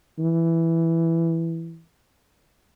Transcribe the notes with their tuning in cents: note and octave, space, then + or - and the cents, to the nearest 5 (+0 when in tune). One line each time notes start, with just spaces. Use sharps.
E3 +5